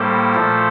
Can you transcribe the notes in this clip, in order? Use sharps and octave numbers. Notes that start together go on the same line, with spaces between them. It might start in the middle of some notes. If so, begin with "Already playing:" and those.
Already playing: A2 G3 A#3 A4 C5
A#2 F3 A3